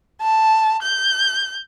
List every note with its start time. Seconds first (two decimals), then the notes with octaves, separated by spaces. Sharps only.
0.22 A5
0.83 G6